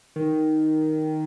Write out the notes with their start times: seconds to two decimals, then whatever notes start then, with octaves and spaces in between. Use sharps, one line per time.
0.16 D#3